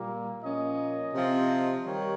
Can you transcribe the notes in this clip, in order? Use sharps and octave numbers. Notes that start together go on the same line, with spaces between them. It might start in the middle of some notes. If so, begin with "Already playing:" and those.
Already playing: A#2 G3 A#3
A#2 F3 A#3 C#4 D#5
C3 F3 C4
D#3 G3 C#5